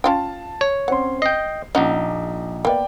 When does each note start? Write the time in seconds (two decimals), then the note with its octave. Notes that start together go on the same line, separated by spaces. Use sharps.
0.04 C#4 F4 F5 G5 A5
0.61 C#5
0.88 C4 C#4 F#5 C6
1.22 D#5 G5 C7
1.75 A#1 C#4 D#4 F#5
2.65 A#3 B3 D5 G5